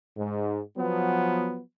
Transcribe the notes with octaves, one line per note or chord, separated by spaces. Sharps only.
G#2
F3 F#3 B3